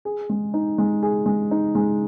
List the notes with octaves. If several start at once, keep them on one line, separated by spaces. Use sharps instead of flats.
G#4
G#3
D#4
G#3
G#4
G#3
D#4
G#3